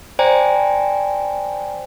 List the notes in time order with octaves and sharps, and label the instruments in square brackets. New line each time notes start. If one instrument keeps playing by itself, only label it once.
[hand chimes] C5 D5 G5 G#5 A#5